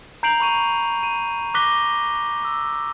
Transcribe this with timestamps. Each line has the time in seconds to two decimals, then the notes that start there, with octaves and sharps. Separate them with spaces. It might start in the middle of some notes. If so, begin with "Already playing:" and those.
0.23 A#5 G6 C7 D7 F7 F#7
0.40 B5 C#6 D#7 F7
1.03 D#7
1.54 D6 F#6 A#6 B6 G7
2.45 E6